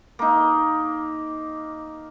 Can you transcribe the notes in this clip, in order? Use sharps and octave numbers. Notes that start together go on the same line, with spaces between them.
A#3 D#4